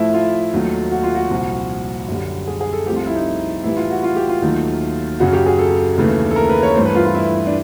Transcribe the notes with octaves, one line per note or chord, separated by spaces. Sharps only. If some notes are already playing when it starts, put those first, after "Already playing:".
Already playing: A2 F3 A3 E4
F4
D#2 D#3 F#3 A3
F#4
F4
F#4
C2 A#2 F3
F#2 D3 G3
G#4
G#4
A4
C2 C3 F3 A3 G4
F4
E4
D#4
A2 E3 G3 E4
F4
F#4
F4
G4
F4
D#2 D#3 F#3 A3
F#2 C#3 F#3 F#4
G4
G#4
A4
D#2 C#3 E3 A3
A4
A#4
B4
C#5
G2 E3 A3 C5
B4
F4
F4
E4
D4